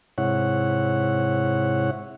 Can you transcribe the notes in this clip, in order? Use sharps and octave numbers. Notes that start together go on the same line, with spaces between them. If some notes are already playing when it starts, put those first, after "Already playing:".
G#2 C3 E4 C#5 F#5